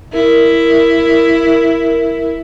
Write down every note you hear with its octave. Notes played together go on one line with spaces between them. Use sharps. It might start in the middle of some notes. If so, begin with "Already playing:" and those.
E4 A#4